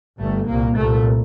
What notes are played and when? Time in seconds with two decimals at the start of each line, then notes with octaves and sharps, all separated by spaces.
0.19 G1 G2 A3
0.47 C2 A#2 A#3
0.75 C2 A#2 A3